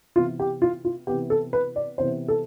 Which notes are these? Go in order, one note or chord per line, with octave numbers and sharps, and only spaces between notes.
C3 E3 B3 F4
G4
F4
F4
C3 E3 B3 G4
A4
B4
D5
C3 E3 B3 C5
A4